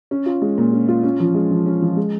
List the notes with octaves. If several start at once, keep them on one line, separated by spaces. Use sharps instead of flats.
C#4
F4
G#3
A#2
C#4
F4
C#4
F3
G#3
F3
C#4
F3
G#3